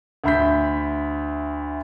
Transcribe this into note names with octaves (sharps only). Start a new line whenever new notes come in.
D2 E5 B5 G6 B6